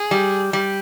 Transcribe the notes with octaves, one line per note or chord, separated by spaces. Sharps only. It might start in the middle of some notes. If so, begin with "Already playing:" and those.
Already playing: G#4
G3
G3